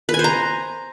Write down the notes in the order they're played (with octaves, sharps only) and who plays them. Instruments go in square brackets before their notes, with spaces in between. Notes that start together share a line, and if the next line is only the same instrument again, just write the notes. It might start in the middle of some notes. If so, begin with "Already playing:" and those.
[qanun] B4
G#5
C5
A#5